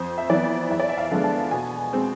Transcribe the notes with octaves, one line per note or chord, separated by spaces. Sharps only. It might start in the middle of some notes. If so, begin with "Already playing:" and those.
Already playing: F2 C5
E5
E3 B3 D5
E2 E5
D5
E5
F5
D3 F3 G#3 B3
A5
B2 G#5
G#3 C4